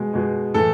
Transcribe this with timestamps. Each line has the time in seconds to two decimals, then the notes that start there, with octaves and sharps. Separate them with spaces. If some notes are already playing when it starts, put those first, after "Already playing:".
Already playing: B2 G#3
0.14 B2 G#3
0.54 A2 E3 A3 A4